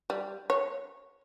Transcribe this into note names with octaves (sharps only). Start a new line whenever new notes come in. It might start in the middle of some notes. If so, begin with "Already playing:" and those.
G3
C#5